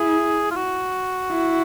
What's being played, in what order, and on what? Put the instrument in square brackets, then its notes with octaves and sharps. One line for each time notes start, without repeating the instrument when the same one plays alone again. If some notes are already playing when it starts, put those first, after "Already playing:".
Already playing: [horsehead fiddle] E4 [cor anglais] G#4
[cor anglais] F4
F#4
[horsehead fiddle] E4